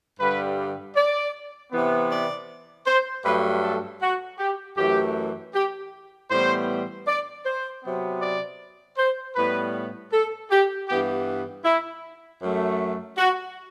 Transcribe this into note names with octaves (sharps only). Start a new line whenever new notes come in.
G2 D3 G3 B4
D5
C3 E3 B3
D5
C5
G2 F#3 A3 B4
A4
F#4
G4
F#2 E3 A3 G4
G4
A2 E3 G3 B3 C5
D5
C5
C3 F#3 B3
D5
C5
A2 G3 B3 B4
A4
G4
G2 E3 B3 G4
E4
F#2 F#3 A3
F#4